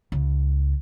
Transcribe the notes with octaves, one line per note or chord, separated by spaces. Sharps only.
C#2